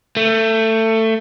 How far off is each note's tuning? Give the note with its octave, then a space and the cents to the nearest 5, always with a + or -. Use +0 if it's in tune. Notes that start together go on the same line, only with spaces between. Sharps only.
A3 +20